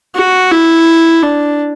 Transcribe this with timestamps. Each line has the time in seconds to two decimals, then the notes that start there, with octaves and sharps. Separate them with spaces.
0.16 F#4
0.52 E4
1.23 D4